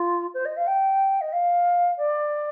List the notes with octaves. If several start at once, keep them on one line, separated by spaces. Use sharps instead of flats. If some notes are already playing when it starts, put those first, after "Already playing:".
Already playing: F4
C5
D#5
F5
G5
D#5
F5
D5